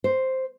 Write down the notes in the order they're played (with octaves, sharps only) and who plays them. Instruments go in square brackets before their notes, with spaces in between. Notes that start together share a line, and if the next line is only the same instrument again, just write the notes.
[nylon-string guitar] C5